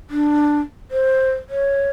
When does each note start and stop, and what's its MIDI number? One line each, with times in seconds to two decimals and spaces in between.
0.10 0.60 62
0.91 1.32 72
1.50 1.90 73